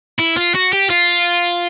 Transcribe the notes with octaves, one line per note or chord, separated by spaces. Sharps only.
E4
F4
F#4
G4
F4